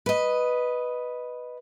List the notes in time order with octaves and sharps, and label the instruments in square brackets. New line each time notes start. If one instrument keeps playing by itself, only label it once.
[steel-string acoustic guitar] B4 D#5